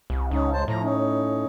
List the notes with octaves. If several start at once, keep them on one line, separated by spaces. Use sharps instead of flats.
C2
C#2 C#4 D#4
G#3 C5 A5
A2 F3 A#5
C#4 D#4